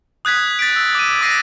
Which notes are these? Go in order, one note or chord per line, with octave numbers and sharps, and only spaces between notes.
D#6 F#6 G#6 B6
A6 B6 D7
E6
D6 D#7
D6 D#6 A#6 C7 D7 D#7